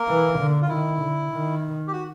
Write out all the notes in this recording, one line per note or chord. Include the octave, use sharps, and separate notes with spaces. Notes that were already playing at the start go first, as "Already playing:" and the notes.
Already playing: A#3 A#4
E3
D3
F4
D#3 E4
D3
D#3
G4
F#4